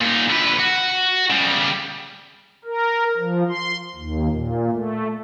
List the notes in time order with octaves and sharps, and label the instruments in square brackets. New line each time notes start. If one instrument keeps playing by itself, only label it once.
[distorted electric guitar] A#2 D#4
D3 B4
F#4
C#3 G3
[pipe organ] A#4
F3
C6
D#2
A#2
A3